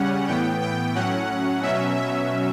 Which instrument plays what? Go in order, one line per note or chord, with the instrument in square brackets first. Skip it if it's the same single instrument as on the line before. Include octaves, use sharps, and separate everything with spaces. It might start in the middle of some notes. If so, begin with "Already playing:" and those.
Already playing: [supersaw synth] C#3 G3 C#4 F#5
A2 E3 B3 G5
G5
A2 F#3 C#4 F#5
B2 F#3 C#4 E5
E5